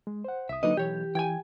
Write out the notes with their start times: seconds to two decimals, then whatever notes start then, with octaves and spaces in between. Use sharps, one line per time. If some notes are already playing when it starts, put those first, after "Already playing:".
0.07 G#3
0.24 C5 F#5
0.49 C2 E5 D#6
0.63 D3 F#3 A#3 D#4 B4 D#5
0.77 B1 E3 G4 C#5
1.15 E3 G5 G#5 G#6